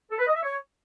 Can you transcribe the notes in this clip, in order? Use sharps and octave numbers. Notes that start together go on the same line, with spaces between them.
A4
B4
D#5
E5
C#5